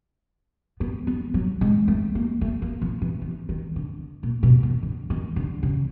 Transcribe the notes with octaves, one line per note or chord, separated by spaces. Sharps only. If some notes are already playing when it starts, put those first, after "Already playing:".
B3
B3
F#3
G#3
A3
A#3
A3
A#3
F3
E3
D#3
D#3
D3
A#2
B2
D#3
D3
D#3
D3
C#3